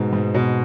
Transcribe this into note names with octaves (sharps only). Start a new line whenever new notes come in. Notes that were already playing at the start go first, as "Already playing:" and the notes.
Already playing: G#2 B2
G#2
B2